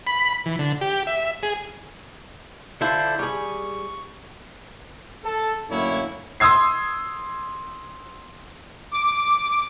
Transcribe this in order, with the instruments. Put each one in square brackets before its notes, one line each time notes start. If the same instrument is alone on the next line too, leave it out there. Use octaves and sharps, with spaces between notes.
[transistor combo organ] B5
E3
D3
G4
E5
G#4
[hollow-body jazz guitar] D3 E4 F4 [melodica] A4 C5
[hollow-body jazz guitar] G3 G#4 [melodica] C#6
[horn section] A4
F#2 A2 D3 A#3 E4 C#5
[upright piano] C6 D#6 E6 G#6 C7
[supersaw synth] D6